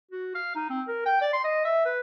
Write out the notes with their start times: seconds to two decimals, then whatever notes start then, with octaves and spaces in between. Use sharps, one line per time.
0.11 F#4
0.35 F5
0.55 D#4
0.70 C4
0.87 A#4
1.06 G5
1.21 D5
1.33 C6
1.44 D#5
1.65 E5
1.85 B4